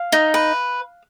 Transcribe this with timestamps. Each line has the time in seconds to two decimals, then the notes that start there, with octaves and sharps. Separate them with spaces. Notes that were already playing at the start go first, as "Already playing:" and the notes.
Already playing: F5
0.12 D#4
0.34 B4